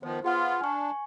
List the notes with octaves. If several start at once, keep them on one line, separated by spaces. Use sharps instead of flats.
D#3 F3 B3 C5
B3 F4 G#4 F#5 F6
D4 G#5 C#6